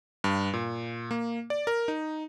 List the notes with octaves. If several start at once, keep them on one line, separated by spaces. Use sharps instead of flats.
G2
A#2
A#3
D5
A#4
D#4